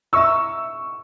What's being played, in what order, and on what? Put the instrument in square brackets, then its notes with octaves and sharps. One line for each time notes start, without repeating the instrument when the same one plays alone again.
[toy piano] E4 B4 E5 A#5 [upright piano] C#6 E6